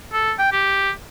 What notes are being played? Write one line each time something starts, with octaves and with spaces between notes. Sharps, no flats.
A4
G5
G4